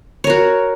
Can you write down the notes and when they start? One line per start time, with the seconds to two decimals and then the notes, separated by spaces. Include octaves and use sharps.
0.24 C#5
0.27 A#4
0.30 F#4